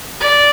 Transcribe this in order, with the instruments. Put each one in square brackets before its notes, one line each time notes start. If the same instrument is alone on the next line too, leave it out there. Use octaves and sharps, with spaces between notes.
[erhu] D5